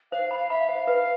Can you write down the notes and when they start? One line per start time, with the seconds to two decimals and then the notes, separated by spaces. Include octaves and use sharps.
0.12 C5 F5
0.31 F5 B5
0.50 E5 B5
0.68 C5 F5
0.87 B4